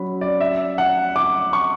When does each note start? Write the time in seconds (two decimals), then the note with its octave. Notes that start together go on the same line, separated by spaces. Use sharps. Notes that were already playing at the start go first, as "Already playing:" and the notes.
Already playing: F#3 C#4 B5
0.21 D5
0.41 E5
0.78 F#5
1.16 D6
1.53 C#6